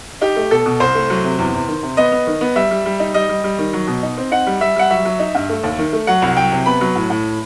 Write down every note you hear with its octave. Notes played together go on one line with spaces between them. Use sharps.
D#4 G4
A3
B2 A4
B2
C2 C5
A3
F#3
C3
E2
E2
D#3
C3
B3 D#5
B3
D#3
B3
G3 E5
G3
G3
D#4
G3 D#5
G3
G3
D#3
F#3
B2
D#4
C4
D#4 F#5
G3
G3 E5
G3 F#5
F#3 E5
F#3
D#4
G2
A3
D#2
D#3
A3
F#3 F#5
C2
F#3 G5
C3
B3 B5
F#3
A2
A2